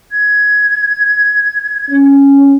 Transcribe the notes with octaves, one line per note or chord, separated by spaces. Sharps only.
G#6
C#4